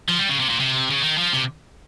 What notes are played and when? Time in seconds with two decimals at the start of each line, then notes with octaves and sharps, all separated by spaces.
0.09 F3
0.19 G3
0.29 C#3
0.40 C3
0.49 A#2
0.60 C3
0.91 C#3
1.02 D#3
1.18 F3
1.33 C3